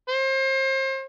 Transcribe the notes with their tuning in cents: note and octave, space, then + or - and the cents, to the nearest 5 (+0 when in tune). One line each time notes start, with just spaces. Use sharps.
C5 +35